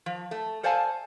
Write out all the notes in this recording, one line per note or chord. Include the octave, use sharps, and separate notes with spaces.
F3
A3
A4 C5 D5 F5 G#5 A5